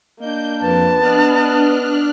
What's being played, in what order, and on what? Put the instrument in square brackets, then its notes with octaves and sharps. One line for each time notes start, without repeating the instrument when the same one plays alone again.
[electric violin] A#3 D4 [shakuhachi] D#5 [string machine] G6
[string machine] F2 [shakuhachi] B4 [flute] A5
[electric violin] B3 D#5 [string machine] D4 F6 F#6